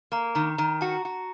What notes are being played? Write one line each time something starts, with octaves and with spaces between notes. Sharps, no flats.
A#3 A#5
D#3 A#5
D#3 A#5
F#4 A5
F#4